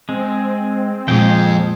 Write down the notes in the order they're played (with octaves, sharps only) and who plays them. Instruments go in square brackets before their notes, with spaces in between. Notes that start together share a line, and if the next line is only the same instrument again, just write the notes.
[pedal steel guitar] G#3 [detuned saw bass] C4
[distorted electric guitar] F2 [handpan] A#2 G#3 [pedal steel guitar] G#4 G5